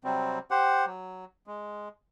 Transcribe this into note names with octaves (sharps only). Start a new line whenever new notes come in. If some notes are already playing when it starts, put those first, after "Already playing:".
C3 F#3 G3 C4
G4 C5 F#5
F#3
G#3